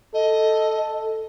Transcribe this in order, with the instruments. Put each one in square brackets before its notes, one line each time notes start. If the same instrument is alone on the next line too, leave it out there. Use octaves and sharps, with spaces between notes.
[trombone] A4 [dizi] D#5